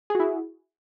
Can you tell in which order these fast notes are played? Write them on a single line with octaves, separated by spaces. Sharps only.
G#4 F#4 E4